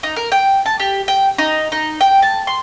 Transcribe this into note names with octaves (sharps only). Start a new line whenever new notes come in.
D#4
A#4
G5
A5
G4
G5
D#4
D#4
G5
A5
C6